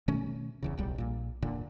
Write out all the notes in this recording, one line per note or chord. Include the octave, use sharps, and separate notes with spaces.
B2 D#3 A3 C#4
D#1 E2 C#3
D1 B1 G3
A#1 A#2
E1 A#2 D3